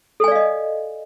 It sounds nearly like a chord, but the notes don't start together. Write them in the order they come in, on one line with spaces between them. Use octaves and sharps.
A4 G#5 D5 F5 D#5